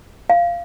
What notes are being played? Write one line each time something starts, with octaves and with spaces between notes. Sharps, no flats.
F5